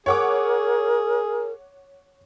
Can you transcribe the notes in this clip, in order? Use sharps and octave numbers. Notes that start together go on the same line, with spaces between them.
G#4 A#4 C#5 F#5 D6